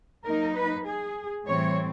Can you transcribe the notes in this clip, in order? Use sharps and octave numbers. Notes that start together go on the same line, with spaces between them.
F#3 A#3 D#4 A#4
B4
G#4
A2 E3 G3 C4 C#5